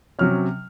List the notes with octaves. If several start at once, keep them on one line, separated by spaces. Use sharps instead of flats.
C3 F#3 C#4 F6